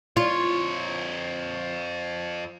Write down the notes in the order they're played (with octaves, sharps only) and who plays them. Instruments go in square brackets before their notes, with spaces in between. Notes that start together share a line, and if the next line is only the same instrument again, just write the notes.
[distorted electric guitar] F2 C#5 [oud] F4